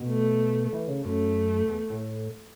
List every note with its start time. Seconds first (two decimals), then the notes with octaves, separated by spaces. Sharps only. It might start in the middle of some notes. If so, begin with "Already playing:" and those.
Already playing: B2
0.09 A3
0.73 E3
0.88 C#3
1.05 F#2 A3
1.68 E2
1.90 A2